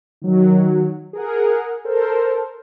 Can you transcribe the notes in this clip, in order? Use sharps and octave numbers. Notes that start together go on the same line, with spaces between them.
D#3 F#3
G#4 A#4 F#5
A4 A#4 C5